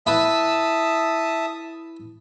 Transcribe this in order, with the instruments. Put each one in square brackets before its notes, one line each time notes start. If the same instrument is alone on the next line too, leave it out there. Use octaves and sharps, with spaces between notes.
[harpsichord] E4 B4 [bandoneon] E5 A5 D#6